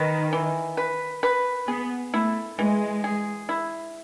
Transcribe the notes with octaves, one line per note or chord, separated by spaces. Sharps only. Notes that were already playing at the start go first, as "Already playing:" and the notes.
Already playing: D#3 B4
E3
B4
B4
B3 G#4
A3 E4
E3 G#3
G#4
E4